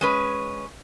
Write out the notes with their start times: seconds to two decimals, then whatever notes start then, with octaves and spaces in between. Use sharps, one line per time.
0.01 G#3 C#4 B4